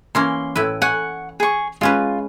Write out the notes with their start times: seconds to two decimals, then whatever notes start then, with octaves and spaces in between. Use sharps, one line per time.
0.15 E3 A#3 C#4 C6
0.55 A2 E4 B4
0.82 F#5 G#5 C#6
1.40 G#4 C#6
1.81 G#3 C#4 F4 B4